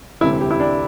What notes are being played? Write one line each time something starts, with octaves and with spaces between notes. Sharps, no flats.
E1 D2 C3 E4
G4
E4
D4